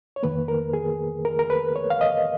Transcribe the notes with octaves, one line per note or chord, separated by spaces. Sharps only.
C#5
F2 D#3 A#3 B4
A#4
G#4
A#4
A#4
B4
C#5
F5
D#5